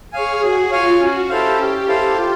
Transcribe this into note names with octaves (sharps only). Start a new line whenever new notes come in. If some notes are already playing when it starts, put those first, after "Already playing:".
G#4 C#5 F5 G#5
F#4 G#4
F4 C#5 F5 G#5
C#4 F#4
E4 G4 A4 C5 F5
C#4
E4 A4 C5 F5
F4